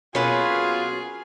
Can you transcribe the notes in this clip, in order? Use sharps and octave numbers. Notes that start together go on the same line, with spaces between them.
B2 F#3 A#3 C#4 F4 G#4 B4 F#5